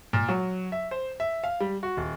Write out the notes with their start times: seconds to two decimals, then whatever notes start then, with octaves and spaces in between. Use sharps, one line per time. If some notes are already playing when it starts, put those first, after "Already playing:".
0.13 A#2
0.29 F#3
0.72 E5
0.91 C5
1.20 E5
1.44 F5
1.60 G3
1.83 F#4
1.97 D#1